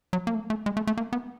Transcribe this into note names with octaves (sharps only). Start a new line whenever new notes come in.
F#3
A#3
A3
A3
G#3
A3
A3
A#3
B3